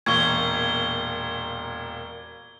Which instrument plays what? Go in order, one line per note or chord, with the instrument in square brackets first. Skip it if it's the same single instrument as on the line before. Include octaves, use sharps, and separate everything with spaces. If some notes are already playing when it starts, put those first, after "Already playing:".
[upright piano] E1 A#2 C#6 [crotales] G#6 G7